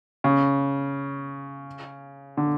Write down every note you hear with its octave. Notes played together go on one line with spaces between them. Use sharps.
C#3
D3